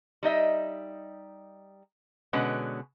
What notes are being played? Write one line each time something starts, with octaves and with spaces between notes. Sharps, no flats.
G3 D#4 D#5 E5
B2 D3 G#3 C#4 B4 F#5